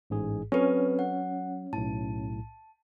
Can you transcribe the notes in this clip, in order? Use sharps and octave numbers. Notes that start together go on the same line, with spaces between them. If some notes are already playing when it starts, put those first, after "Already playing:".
A1 G#2 G#4
F#3 C4 C#4 A4 B4
F#5
B1 A2 A5